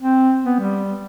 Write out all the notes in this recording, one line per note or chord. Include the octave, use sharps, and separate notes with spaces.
C4
B3
G3